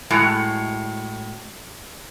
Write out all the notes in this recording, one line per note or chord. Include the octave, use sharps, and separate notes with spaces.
A2 G#3 F#4